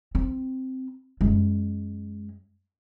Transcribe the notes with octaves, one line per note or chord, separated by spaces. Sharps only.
C4
F#2 G#3